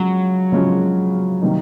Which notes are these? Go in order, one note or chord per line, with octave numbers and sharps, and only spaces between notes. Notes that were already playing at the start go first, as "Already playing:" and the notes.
Already playing: C#3 F3 F#3 G#3 C#4
C#3 F3 G#3 C#4 F#4
C3 D#3 G3 A#3 D#4